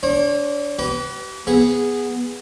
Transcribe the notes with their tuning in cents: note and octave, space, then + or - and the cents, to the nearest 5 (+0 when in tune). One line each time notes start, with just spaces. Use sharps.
D4 -25 C#5 -45
G4 -40 B4 +0
B3 -5 G#4 -10